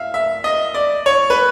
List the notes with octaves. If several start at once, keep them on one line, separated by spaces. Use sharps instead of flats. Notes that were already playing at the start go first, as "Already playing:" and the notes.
Already playing: E5 F5
E5
D#5
D5
C#5
B4